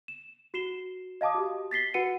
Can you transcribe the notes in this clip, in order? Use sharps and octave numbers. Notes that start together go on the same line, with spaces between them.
E7
F#4 C7 E7 G7
D#5 F5 A5 D6 D#6
F#4 G4
A6 B6 C7 G7
F#4 B4 F#5 C#7 D#7